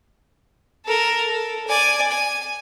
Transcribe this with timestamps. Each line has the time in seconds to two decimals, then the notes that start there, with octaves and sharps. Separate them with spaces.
0.85 A4 A#4
1.29 A4
1.68 D5 G#5
2.11 G#5